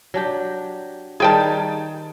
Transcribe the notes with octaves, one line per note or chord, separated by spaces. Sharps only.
F#3 D4 G4
D#3 G3 D#4 G#4 G5 A5